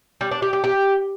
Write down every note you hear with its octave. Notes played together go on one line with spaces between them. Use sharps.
G3
D4
G4
G4
G4